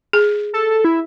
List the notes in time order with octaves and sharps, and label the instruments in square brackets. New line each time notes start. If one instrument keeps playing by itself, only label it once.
[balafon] G#4
[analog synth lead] A4
E4